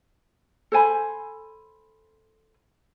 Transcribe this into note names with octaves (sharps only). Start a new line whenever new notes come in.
A4 C5 G#5 B5